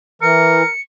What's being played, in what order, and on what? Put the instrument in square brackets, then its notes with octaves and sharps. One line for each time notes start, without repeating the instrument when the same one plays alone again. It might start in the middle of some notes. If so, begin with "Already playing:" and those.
[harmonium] E3 [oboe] A#4 [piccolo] C#7